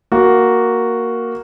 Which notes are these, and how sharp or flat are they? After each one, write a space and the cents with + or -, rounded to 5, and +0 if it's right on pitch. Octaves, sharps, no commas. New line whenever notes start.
A#3 +0 F#4 +0